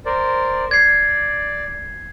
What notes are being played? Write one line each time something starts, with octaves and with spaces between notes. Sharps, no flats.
A#4 C5 D5
D5 G#6 C7